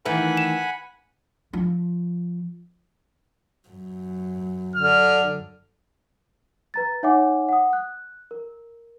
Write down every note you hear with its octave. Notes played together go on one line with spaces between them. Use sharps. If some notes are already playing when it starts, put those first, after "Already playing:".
D#3 E3 A3 B4 F#5 G#5 B5
E7
F3
F#2
D3 F6
B4 A#5 A6
D#4 C#5 E5 F#5 G#5 D6
F#5 D#6
F#6
A#4